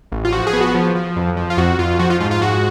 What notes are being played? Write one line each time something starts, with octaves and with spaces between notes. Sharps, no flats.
A1
F4
F3 F#4
G#4
B3
F#4
F3
F3
F2
F3
F4
F2 F#4
F2 F4
F3 F#4
F4
G#2 F4
F4
G#2 F#4